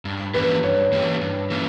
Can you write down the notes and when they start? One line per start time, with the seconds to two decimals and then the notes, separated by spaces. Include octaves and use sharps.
0.05 G2
0.34 E3 A#3 C#4 G4 B4
0.63 G2 C#5
0.92 E3 A#3 C#4 G4
1.21 G2
1.50 E3 A#3 C#4